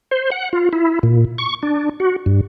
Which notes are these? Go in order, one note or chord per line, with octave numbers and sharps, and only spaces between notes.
C5
F#5
F4
E4
A#2
C#6
D4
F#4
G2